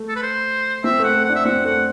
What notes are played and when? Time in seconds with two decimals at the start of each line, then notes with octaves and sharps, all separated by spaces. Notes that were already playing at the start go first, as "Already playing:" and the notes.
Already playing: A3
0.09 A4
0.16 B4
0.23 C5
0.84 C4 E5
0.99 A3 F#5
1.14 A3
1.25 D4 F#5
1.35 E5
1.45 C4 F#5
1.65 A3 F#5